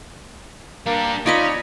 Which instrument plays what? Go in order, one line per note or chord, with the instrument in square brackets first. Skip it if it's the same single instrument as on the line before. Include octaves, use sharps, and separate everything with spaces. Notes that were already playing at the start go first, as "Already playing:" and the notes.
[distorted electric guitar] G3 D4 [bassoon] A#3
[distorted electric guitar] C#4 [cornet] D#4 [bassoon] F4 [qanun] D5 D#5 B5